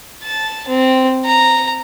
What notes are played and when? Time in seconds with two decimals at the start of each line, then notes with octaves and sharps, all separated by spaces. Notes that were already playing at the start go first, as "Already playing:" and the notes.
0.23 A5
0.68 C4
1.26 A#5